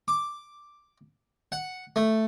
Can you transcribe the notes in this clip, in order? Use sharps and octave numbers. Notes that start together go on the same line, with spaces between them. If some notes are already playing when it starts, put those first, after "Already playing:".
D6
F#5
A3